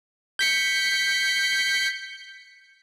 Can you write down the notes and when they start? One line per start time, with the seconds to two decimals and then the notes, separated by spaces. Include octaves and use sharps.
0.39 G6 B6 C#7